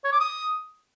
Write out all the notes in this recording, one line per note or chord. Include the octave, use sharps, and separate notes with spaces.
C#5
D6
D#6